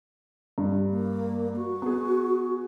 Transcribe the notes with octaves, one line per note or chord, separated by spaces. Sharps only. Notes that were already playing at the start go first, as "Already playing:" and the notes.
G2
A#3
F#4
B3 G#4